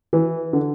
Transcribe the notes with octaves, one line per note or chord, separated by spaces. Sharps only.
E3
D3